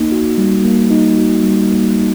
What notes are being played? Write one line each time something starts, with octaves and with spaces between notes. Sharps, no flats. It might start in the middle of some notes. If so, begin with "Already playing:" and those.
Already playing: A#3 D#4
F#4
G3
A#3
D#4
F#4
G3
A#3
D#4